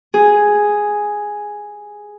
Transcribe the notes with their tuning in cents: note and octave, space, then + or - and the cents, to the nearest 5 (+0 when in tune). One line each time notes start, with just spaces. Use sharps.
G#4 +0